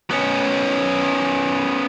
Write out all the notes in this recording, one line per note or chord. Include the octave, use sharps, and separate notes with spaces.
B3 C#4